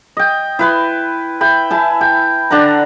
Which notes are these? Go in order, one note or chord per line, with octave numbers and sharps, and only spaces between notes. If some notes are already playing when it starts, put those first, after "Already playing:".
D#5 G5
E4 B4 C6
E5 G5 B5
E4 G#5 A5
G5
D3 D4 F#5 A#5